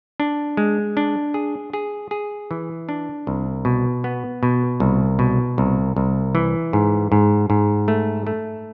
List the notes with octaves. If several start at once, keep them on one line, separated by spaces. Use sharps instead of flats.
D4
G#3
D4
G#4
G#4
G#4
E3
D4
C2
B2
B3
B2
C2
B2
C2
C2
E3
G#2
G#2
G#2
A3
A3